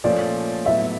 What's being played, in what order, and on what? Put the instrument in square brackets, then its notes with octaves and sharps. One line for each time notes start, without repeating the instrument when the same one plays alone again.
[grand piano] A#2 F3 A3 C#4 [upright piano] D5
[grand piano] A2 F#3 B3 [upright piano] E5